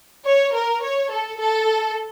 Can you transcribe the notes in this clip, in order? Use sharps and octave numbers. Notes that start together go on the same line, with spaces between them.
C#5
A#4
C#5
A4
A4